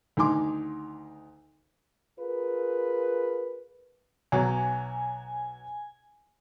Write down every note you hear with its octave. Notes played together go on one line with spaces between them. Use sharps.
D2 D#3 D#4 G#5 C6 D6
F4 G#4 A#4 B4
B1 F#3 G#5